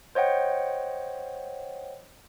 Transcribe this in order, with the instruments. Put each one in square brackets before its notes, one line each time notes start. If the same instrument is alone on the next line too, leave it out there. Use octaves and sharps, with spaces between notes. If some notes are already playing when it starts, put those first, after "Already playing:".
[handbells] C5 C#5 D#5 F#5 G5